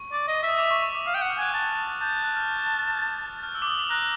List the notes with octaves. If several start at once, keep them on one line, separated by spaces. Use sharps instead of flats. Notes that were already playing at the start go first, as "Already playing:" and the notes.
Already playing: C#6
D5
D#5
E5
D#6
D6
C#6
C#6
D6
F5 D#6
G5
D#6
F#5
F6
G#5 F#6
A5
A5 G6
F#6
F#6
F6
F6
E6
D6
D#6
D6
A#5 F#6